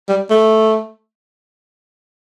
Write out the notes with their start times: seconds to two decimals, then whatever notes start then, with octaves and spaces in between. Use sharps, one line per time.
0.08 G3
0.31 A3